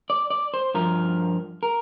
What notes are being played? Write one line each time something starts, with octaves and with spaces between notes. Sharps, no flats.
D5
D5
C5
G2 F3 A#4
A#4